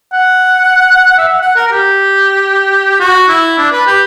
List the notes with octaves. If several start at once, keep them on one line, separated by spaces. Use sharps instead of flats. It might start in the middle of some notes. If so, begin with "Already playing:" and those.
F#5
E5
F#5
F#5
A#4
A#4
G4
F#4
E4
D4
B4
G4